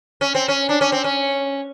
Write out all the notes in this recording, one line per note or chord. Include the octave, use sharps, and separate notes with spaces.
C#4
C4
C#4
D4
C#4
C4
C#4